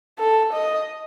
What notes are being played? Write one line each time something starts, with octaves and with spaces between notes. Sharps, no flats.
A4
D#5